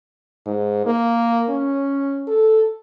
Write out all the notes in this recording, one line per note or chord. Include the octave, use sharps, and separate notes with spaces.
G#2
A#3
C#4
A4